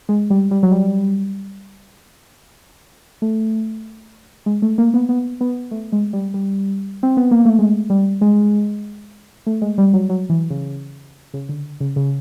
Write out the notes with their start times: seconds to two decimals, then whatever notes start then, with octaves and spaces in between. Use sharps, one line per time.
0.09 G#3
0.30 G3
0.51 G3
0.63 F#3
0.72 G3
3.22 A3
4.46 G#3
4.62 A3
4.78 A#3
4.94 B3
5.09 B3
5.41 B3
5.71 A3
5.92 G#3
6.13 G3
6.34 G3
7.03 C4
7.17 B3
7.31 A#3
7.45 A3
7.59 G#3
7.90 G3
8.21 G#3
9.47 A3
9.62 G#3
9.78 G3
9.93 F#3
10.09 F#3
10.30 E3
10.50 C#3
11.34 C#3
11.49 D3
11.80 C#3
11.96 C#3